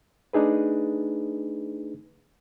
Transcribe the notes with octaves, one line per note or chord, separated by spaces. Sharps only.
A3 D4 D#4 G#4 B4